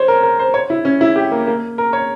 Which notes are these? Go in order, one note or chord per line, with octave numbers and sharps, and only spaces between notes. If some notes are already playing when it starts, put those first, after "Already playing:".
Already playing: C5 C#5
A#4
A#4
C5
C#5
E4
C#4
E4
G4
A#3
A#3
A#4
C#5